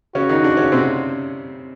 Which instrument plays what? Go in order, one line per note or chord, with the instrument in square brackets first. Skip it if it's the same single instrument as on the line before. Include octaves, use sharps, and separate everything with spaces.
[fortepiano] C#3 C#4 [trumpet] F#4
[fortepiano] D#3 D#4
D3 D4
C#3 C#4
C3 C4